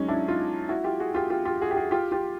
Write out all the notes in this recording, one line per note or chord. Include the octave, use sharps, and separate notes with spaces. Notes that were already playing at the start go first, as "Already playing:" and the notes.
Already playing: F#3 G#3 C#4 D#4
D4 E4
D#4 F4
E4 F#4
F4 G4
F#4 G#4
F4 G4
F4 G4
F4 G4
F#4 G#4
G4
F#4 G#4
F4 G4
F4 G4